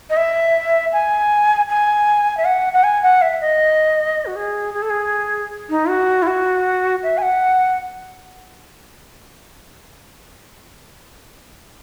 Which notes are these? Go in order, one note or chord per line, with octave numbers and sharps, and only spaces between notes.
D#5
E5
G#5
G#5
E5
F#5
F#5
G#5
F#5
E5
D#5
F#4
G#4
G#4
A4
G#4
D#4
F#4
E4
F#4
E5
G#5
F#5